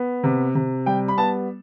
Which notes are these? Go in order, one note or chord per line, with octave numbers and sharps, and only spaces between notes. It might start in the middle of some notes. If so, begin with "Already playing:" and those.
Already playing: B3
C3
C3
G3 G5
B5
B3 A5